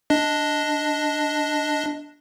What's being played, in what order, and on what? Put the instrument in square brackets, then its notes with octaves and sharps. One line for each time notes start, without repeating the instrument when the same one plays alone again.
[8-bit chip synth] D4 D#5